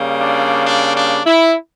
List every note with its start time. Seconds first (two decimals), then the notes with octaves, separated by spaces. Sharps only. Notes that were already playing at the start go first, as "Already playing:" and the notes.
Already playing: C#3 G3 A#3
0.19 D4
0.66 D4
0.96 D4
1.26 E4